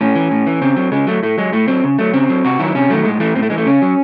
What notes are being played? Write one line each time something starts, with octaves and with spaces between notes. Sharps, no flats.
A2 C#4
E3
A2
E3
C#3 C4
F#3
C#3 G#3
F#3 A3
A2 A3
F#3 G#3
A2 A3
F#3 C4
C#3
F#3 A3
C#3 C4
F#3
C3 F#4
D#3 F#3 E4
C3 C#4
D#3 F#3 A3
A2 G#3
E3 A3
A2 C4
A3
E3 G#3
A3
C#3 C#4
F#3